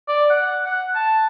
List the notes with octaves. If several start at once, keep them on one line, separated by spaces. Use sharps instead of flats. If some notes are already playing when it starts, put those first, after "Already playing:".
D5
F#5
F#5
A5